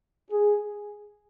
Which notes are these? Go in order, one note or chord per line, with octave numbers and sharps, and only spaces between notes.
G#4